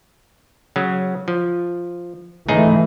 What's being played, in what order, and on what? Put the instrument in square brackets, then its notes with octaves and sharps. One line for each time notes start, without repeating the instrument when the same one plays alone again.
[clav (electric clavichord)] C#3 F#3
F3
[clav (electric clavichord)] C#2 D#4 G#4 [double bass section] E3 G#3 A3